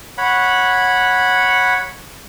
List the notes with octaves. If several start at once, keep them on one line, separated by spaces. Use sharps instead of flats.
C#5 F#5 B5